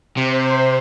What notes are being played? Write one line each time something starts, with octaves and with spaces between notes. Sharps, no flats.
C3 C5